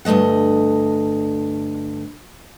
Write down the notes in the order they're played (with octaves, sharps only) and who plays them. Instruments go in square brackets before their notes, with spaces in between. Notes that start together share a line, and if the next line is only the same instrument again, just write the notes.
[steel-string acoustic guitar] D2 G2 A3 D#5 F#5